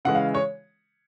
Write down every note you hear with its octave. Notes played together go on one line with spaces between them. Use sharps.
C#3 E3 G#3 F#5
F5
C#5